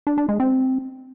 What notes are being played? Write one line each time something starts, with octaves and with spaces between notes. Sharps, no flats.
D4
D4
G#3
C4